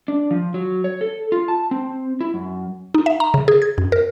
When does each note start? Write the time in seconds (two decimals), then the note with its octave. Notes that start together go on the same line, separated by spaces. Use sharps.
0.08 D4
0.31 F3
0.54 F#3
0.84 C#5
1.01 A4
1.32 F4
1.48 A5
1.71 C4
2.21 E4
2.34 F#2
2.94 D#4
3.06 E5
3.20 A#5
3.34 C#3
3.48 G#4
3.62 G#6
3.78 F#2
3.92 A#4